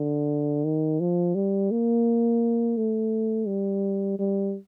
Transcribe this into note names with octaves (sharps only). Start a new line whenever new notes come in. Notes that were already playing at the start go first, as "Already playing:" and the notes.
Already playing: D3
D#3
F3
G3
A#3
A3
G3
G3